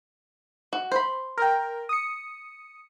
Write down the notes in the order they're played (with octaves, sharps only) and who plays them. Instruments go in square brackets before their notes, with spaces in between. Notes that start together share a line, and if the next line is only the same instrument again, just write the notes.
[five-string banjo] F#4
C5 B5
[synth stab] A#4 G5
D#6 C#7